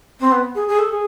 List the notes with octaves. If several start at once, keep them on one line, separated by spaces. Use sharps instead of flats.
C4
B3
G#4
G#4
A4
G#4